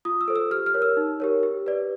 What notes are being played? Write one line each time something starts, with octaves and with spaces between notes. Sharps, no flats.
F4 D#6
E6
A4 C5
E6
G4 F6
F6
A#4 C#5
E6
D#4
G4 A#4 C#5
G4
B4 D5